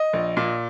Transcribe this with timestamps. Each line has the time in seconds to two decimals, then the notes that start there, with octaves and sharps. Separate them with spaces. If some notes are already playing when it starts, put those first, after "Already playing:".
Already playing: D#5
0.13 A#1
0.37 A#2